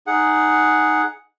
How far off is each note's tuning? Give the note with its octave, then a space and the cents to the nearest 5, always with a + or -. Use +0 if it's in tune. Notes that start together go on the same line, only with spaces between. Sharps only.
D#4 -5 G#4 +5 F#5 +0